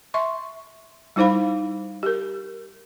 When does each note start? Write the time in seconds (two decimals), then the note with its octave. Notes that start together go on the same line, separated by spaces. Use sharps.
0.14 E5 C6 C#6
1.16 G3 D#4 E4 C5 F5 B5
2.03 G4 A#4